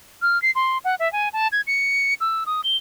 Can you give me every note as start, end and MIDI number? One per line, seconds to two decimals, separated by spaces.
0.22 0.40 89
0.42 0.51 96
0.55 0.78 84
0.85 0.95 78
1.00 1.11 76
1.13 1.29 80
1.33 1.48 81
1.52 1.61 92
1.67 2.14 97
2.21 2.44 88
2.46 2.61 87
2.64 2.77 103